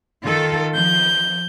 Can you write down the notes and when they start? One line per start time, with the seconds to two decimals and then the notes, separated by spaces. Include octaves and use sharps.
0.22 D#3 F4 A4
0.74 F3 G6